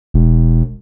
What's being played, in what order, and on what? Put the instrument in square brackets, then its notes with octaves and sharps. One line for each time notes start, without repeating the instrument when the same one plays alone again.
[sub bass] E1